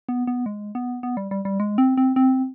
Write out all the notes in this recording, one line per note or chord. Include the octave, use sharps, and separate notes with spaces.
B3
B3
G#3
B3
B3
G3
G3
G3
G#3
C4
C4
C4